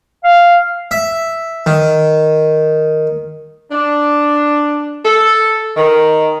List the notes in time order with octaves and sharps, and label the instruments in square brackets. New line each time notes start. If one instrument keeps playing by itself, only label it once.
[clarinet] F5
[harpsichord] E5
D#3
[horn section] D4
A4
D#3